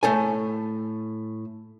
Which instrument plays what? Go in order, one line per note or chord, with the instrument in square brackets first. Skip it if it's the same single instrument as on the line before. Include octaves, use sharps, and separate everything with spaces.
[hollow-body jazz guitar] A2 A3 A4 G#5